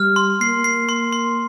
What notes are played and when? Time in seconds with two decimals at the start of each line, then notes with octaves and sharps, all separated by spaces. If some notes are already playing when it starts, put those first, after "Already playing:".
Already playing: G3 F6
0.16 C6
0.41 A#3 C7
0.64 C7
0.89 C6
1.12 C6